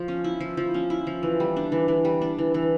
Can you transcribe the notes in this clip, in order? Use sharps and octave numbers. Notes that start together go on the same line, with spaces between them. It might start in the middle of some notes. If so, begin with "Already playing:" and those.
Already playing: F3
C#4
E4
F3
F3
C#4
E4
F3
E3
G3
D4
E3
E3
G3
D4
E3
E3